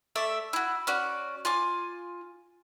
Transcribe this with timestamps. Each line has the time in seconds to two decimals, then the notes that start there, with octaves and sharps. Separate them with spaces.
0.16 A3 A4 D5 E5
0.53 E4 F#4
0.87 C#4 F#4 D5
1.45 F4 G#5 D6